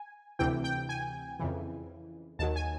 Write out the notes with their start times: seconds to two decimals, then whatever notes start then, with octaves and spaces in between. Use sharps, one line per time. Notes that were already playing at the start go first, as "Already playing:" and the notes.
Already playing: G#5
0.39 D2 C3 E3 G5
0.64 G5
0.89 G#5
1.40 F2 C#3 E3
2.39 D#2 D#3 F#3 A5
2.56 G#5